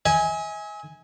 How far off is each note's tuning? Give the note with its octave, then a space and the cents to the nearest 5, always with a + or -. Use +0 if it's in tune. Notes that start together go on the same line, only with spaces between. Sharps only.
E5 -45 G#5 +0